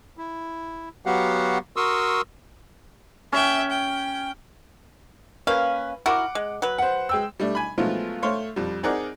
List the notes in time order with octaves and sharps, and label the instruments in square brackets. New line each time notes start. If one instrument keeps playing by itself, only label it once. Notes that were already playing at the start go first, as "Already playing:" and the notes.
[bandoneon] E4
F#3 B3 F#4 G4 F5 F#5
F#4 A#4 C6 C#6 D#6 E6
[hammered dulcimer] C#4 [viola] E5 G5
[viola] G5
[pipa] A#3 C#4 F5 [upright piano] B4
[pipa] E4 F#4 A#4 [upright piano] F#5 D6
[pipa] G#3
F#3 B4
[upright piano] C5 F#5
G#3 G5 E6
[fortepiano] G3 A3 D4
G#5 B5
F3 F#3 G#3 A3 B3 F4
A3 C5 C#5 F5
F2 G3
C4 D#4 G#4 A#4 D5 F#5